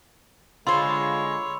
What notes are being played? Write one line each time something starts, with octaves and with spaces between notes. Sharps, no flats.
D3 G#3 F4 C5 C#5 B5 C6 E6